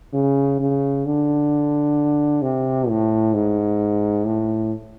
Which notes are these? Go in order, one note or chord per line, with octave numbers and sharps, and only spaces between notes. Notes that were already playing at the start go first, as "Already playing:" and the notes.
C#3
C#3
D3
C3
A2
G#2
A2